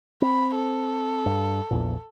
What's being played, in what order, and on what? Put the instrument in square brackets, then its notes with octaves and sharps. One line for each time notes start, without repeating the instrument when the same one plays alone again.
[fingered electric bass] C4 [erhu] B5
[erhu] A4
[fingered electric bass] G2
A#1 E2 A#2